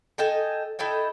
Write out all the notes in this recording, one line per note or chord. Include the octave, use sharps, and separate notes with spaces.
A4 D#5 G5 G#5
E4 A4 D#5 G5